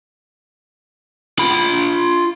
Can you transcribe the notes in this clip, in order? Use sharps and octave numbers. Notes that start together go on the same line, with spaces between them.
F4 B5